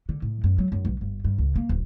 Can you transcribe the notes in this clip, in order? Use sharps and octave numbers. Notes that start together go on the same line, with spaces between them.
D3
A2
F#2
F#3
F#2
B1
G1
G2
C#2
A#3
D1